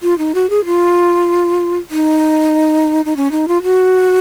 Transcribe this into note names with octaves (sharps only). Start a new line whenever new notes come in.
F4
D#4
F#4
G#4
F4
D#4
D#4
C#4
D#4
F4
F#4